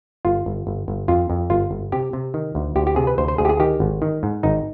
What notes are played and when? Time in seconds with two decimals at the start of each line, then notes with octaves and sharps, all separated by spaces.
0.25 G1 F4
0.46 G1
0.67 G1
0.88 G1
1.08 F2 F4
1.30 F2
1.50 G1 F4
1.71 G1
1.92 C3 G4
2.13 C3
2.34 D#3
2.55 D2
2.76 D2 G4
2.87 G4
2.96 C3 G#4
3.07 B4
3.18 D2 C5
3.28 C5
3.38 D2 G#4
3.45 G4
3.49 G#4
3.60 D#3 G4
3.80 G#1
4.02 D#3
4.23 G#2
4.43 G#1 D#4